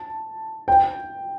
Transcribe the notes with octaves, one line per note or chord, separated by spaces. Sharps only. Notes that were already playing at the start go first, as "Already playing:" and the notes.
Already playing: A5
G5